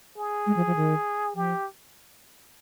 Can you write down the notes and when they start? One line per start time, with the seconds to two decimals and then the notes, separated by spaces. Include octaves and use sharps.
0.17 G#4
0.46 G#3
0.56 F3
0.67 F3
0.76 D#3
1.35 F3 G4